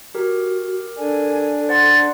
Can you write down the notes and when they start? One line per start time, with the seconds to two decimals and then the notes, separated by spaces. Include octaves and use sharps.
0.15 F#4 G4 A#4
0.98 D4 A4 G#5
1.69 C5 F#5 C6 A6